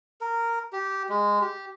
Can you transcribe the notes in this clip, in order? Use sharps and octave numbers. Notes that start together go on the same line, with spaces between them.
A#4
G4
G#3
G4